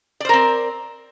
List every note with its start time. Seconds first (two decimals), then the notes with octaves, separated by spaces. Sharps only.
0.20 D5
0.25 C5
0.29 A#4
0.33 C4